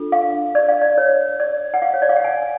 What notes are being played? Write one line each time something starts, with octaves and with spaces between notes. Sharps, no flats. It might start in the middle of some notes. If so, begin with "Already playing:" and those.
Already playing: D4 F4 A4
F5
D5
F5
D5
C#5
D5
F#5
F5
C#5
D5
F5
F#5
G#5